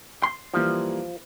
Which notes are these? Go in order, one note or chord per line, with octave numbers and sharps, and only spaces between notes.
C6
E3 F3 G3 A#3